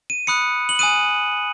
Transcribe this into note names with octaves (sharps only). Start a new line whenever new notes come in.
D#7
B5 D#6 F#6 C#7
F#7
G#5 D#6 F#6 D#7